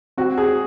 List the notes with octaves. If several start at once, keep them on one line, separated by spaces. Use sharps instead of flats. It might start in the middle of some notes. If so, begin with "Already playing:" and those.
C4 F#4
G#4